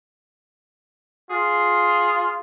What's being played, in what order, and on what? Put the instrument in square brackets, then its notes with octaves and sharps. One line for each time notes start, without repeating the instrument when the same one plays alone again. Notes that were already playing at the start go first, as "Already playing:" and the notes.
[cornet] F4 [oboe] G#4